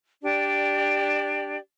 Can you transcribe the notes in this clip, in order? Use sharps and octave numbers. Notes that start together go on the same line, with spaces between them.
D4 G4 D5